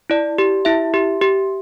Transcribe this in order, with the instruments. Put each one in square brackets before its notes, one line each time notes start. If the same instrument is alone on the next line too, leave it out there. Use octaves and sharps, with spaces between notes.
[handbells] E4 D5
G4
E4 E5
G4
G4